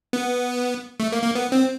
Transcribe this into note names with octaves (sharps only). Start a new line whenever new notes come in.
B3
A3
A#3
A#3
B3
C4